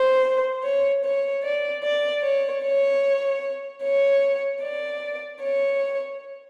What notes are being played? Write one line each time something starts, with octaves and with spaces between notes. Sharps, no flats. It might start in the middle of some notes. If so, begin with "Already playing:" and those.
Already playing: C5
C#5
C#5
D5
D5
C#5
C#5
C#5
D5
C#5